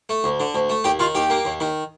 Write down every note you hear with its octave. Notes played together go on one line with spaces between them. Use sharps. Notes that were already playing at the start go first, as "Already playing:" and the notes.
A3
D2
D3
D2
A3
D#2 G4
D#3 F4
D#2 G4
A#3
D#2
D#3